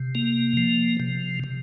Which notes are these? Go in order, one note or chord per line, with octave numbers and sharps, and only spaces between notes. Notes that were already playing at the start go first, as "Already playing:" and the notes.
Already playing: C3
A#3
F3
C3
C3